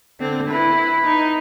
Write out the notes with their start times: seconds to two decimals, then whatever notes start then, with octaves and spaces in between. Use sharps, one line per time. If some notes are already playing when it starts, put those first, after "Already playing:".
0.20 D3 C4
0.51 E4 B4
1.05 D#4